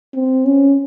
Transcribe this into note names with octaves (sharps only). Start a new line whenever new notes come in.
C4
C#4